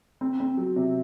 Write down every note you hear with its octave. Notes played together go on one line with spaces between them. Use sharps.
C4
C4
F#3
C3